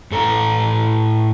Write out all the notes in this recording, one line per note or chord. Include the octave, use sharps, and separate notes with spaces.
A2 A4 A#5